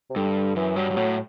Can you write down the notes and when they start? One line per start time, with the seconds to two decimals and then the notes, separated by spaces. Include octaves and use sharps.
0.10 C3
0.16 G2 D3
0.56 F#2 E3
0.76 G2 F#3
0.91 G2
0.96 A2 F#3